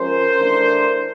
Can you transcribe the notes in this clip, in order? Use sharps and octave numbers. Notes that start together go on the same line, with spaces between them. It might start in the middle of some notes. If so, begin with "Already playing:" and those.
Already playing: F3 G#3 C#4 A#4 C5
E3 A3 D4